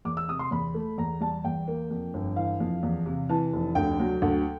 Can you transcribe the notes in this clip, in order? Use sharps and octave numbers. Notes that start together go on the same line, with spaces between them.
E2 D6
E6
C3 D#6
C6
E2 B5
A3
E2 A#5
G3 A5
E2 G5
A#3
F2
G1
E3 F5
F2
E2
C3
E3 A5
F1
D2 G5
F#3
D2